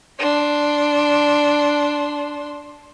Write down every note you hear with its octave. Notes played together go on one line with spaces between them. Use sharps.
D4 C6